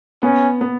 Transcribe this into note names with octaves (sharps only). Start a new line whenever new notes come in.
B3 C#4
B3